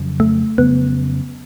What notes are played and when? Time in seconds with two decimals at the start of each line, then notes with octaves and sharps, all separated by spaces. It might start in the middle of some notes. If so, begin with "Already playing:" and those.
Already playing: F2 C#3 F#3 C#4
0.20 A3
0.58 F2 C#3 F#3 B3 C#4